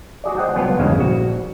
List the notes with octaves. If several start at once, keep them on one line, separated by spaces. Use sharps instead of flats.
F#4 G#4 D5
C5 D#5 F#5 G5 A5
C2 F#3 B3 F4 G5 G#5
E2 G2 C#3 G#3 A#3
A#1 F#4